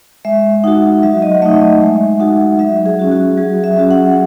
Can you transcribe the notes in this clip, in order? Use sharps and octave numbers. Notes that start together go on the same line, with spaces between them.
G#3 E5
D#4 F#4 F#5
F#3 E5
D#5
F#5
A3 D#4 E5
D#5
G#3 E5
D#4 F#4 F#5
F#3 E5
G#4
C#4 F#4
F#4
F#3 G#4
E5
C#4 F#4
F#5